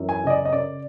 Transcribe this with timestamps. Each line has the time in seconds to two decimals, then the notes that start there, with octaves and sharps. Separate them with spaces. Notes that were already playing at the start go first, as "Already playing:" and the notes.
Already playing: F#2 E3
0.09 G#5
0.24 C#3 D#5
0.30 D5
0.45 D#5
0.52 C#3 D5